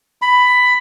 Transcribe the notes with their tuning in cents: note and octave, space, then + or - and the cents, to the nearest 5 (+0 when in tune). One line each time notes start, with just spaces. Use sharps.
B5 +10